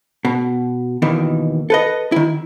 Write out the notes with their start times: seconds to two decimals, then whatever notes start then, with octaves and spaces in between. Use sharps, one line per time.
0.25 B2
1.02 D#2 B2 D#3 E3
1.70 A4 B4 D#5
2.12 D#3 E4